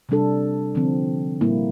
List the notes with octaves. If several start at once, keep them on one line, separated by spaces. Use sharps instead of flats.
C3 G3 D4 A4
D3 F3 C4
A#2 G3 A#3 E4